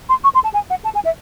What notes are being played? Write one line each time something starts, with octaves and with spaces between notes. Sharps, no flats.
C6
C#6
C6
A5
G#5
F#5
A5
G#5
E5